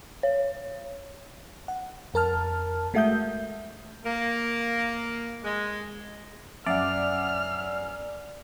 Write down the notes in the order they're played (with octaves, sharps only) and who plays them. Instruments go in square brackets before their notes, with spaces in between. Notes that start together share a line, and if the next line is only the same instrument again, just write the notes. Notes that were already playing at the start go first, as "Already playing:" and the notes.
[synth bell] C#5
[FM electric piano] F#5
F2 A#4 A5 F6
G#3 A3 F#4 E5 D#6 G6
[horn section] A#3
G#3
[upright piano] F#2 [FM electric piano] D5 [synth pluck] E5 F#5 [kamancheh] F6